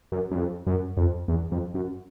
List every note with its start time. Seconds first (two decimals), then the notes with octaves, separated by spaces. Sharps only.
0.12 F#2
0.31 F#2
0.35 F2
0.66 F#2
0.97 F2
1.28 E2
1.52 F2
1.74 F#2